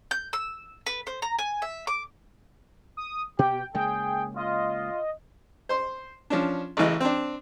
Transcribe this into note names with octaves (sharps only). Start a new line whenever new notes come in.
G6
E6
B4
C5
A#5
G#5
E5
D6
D#6
B2 B3 G4 G5
C#3 G#3 A#3 G#4 G5
F4 D#5
C5 C6
F3 C#4 D4
A1 C#3 E3 D#5
C4 D4